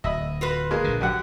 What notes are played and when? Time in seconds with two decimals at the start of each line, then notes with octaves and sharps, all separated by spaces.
0.04 D1 D#5 E5 B5
0.41 F4 F#4 B4
0.71 G#3 A#3
0.84 A#1 D3
1.01 F#2 G4 F#5